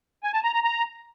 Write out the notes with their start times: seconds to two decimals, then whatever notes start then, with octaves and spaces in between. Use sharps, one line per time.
0.23 G#5
0.33 A5
0.44 A#5
0.54 A#5
0.64 A#5